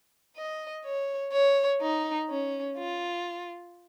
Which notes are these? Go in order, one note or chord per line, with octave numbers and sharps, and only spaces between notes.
D#5
C#5
C#5
D#4
C#4
F4